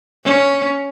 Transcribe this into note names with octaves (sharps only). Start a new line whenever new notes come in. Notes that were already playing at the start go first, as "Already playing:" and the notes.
C#4